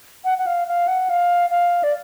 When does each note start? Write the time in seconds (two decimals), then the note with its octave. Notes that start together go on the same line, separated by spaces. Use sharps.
0.25 F#5
0.38 F#5
0.46 F5
0.67 F5
0.87 F#5
1.09 F5
1.50 F5
1.83 D5